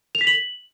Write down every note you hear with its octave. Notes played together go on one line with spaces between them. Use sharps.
F7
B6
F#7